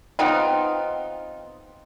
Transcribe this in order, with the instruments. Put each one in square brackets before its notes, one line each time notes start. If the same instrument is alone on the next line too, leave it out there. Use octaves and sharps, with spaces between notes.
[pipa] B3 C4 D#4 F4